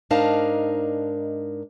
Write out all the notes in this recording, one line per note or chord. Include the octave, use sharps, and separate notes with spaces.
G#2 D4 D#4 A#4 F5 A5